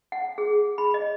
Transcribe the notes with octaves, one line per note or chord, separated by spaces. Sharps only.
F#5
G#4
B5
D#5